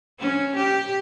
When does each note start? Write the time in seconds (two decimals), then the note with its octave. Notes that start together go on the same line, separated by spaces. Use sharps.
0.20 C#4
0.56 G4